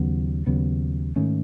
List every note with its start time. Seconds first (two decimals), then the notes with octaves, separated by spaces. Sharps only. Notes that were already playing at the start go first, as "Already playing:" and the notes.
Already playing: D#2 C#3 F#3 B3
0.47 D#2 C#3 F#3 B3
1.16 G#2 D#3 A3 C#4